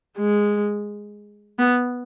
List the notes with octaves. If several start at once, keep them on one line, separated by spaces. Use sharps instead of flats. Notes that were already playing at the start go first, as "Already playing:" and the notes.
G#3
B3